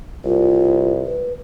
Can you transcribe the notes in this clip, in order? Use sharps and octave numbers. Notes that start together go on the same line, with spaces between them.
C2 F4
B4